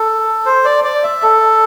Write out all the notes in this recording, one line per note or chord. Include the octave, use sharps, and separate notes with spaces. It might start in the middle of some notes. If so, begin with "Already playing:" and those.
Already playing: A4
C5
D5
D5
E5
A4